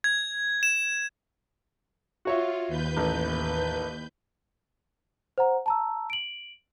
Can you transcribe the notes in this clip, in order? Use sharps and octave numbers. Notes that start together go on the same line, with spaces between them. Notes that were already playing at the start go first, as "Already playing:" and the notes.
G#6
E7
F4 F#4 C#5 E5
D#2 B4 G6
A1
C5 F#5 A#5
A5 A#5 E6
D7 F#7